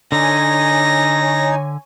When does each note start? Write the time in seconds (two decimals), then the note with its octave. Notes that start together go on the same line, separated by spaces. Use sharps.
0.12 D3 D#4 C#5 G#5 A#6